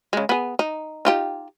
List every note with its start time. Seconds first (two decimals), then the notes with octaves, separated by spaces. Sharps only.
0.13 C#3 G#3
0.29 B3 G#4
0.59 D#4
1.05 D#4 F4 G4